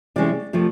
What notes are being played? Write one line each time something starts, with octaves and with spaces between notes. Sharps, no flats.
C3 E3 G#3 C#4 D5
C3 F3 A3